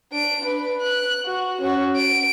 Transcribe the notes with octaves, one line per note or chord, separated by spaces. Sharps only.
D4 D7
B4
F#6
F#4
C#4 F#4
D7